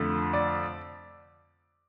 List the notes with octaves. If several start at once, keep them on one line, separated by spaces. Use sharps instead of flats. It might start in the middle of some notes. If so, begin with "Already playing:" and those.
Already playing: F2 D3 A3
D5